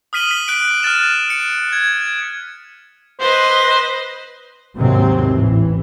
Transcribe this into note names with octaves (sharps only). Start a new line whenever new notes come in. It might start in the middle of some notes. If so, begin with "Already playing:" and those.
D#6 F6 B6 D#7 F#7 G7
B6
F#6 D7
F6 F#6 A6 E7
C#7
G#6
B4 C5 D#5
D#2 G#2 C3 F#3 C4
A1 E3